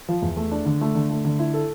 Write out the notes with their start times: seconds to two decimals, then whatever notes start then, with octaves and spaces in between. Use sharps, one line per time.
0.09 F3
0.22 E2
0.37 A3
0.52 D4
0.66 D3
0.81 A3
0.95 D3
1.10 A3
1.25 D3
1.39 E4
1.54 A4